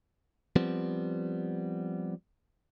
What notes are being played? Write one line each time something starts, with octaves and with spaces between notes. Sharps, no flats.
F3 G3 B3 C4